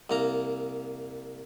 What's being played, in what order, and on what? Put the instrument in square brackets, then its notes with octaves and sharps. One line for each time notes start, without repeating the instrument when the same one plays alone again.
[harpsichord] C2 A#3 A#5